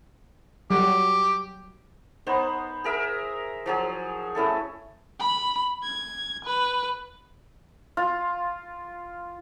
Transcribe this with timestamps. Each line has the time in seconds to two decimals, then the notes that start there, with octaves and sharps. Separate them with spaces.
0.70 F#3 G3 F#4 G4
2.27 B3 D#4 C5
2.84 G#4 A#4 E5
3.66 F3 F#3 G#4
4.35 A3 C#4 E4 A4
5.20 B5
5.83 G#6
6.45 B4
7.97 F4